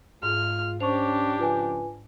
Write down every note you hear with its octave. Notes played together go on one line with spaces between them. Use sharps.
G#2 G#3 F4 F6
C#4 D4 G4 C5 C#6 F7
C#3 F3 F4 B4 G#5